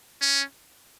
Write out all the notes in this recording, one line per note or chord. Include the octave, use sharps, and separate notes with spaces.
C#4